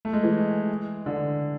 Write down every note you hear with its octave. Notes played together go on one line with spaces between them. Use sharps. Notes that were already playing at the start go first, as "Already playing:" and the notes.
A3
G#3
E3
D3